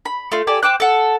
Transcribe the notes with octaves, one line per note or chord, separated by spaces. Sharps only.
B5
A3 F4
G4 A4 D5 G#5
C5 G5 D6 F#6
A4 F#5